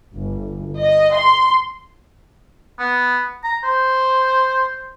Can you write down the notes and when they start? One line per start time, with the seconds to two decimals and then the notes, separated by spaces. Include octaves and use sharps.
0.15 G1
0.79 D#5
1.13 C6
2.79 B3
3.44 A#5
3.64 C5